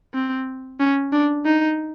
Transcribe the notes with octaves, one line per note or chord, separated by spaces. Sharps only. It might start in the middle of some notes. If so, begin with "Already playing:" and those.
C4
C#4
D4
D#4